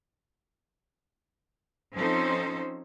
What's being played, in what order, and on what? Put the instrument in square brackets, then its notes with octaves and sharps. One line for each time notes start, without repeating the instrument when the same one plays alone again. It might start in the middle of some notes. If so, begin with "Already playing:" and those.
[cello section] F3 C4 C#4 D#4 A4 C5